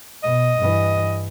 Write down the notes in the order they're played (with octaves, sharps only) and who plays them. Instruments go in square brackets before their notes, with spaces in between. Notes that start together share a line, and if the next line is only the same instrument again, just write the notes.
[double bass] B2 [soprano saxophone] D#5
[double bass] G2 E3